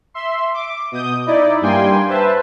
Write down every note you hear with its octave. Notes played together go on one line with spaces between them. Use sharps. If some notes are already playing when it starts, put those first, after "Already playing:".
E5 C6
D6
B2 D#6 G6
D#4 E4 D5
G2 G3 A#3 G5 G#5 C6
B4 C5 E5 A5